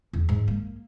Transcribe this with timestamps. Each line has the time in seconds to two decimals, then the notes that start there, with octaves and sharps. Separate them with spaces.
0.13 E2
0.29 G#2
0.48 A#3